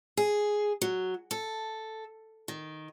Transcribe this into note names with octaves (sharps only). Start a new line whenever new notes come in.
G#4
F#3
A4
D#3